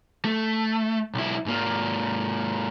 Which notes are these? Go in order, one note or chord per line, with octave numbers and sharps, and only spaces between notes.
A3
B1 E4
G#2 A#3